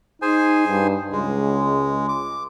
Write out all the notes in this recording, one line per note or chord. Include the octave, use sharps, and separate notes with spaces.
D#4 G#4 C5 G#5
G2
C#2 G#3
D6